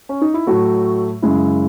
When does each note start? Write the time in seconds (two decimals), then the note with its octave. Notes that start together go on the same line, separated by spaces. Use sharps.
0.09 C#4
0.22 D#4
0.34 E4
0.47 A2 F#3 A3 F#4
1.22 F#2 C#3 G#3 E4